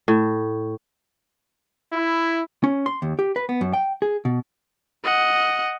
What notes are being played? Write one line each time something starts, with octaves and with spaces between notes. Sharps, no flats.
A2
E4
C#4
C6
D#2
G4
B4
B3
F#2
G5
G#4
B2
D#5 F#5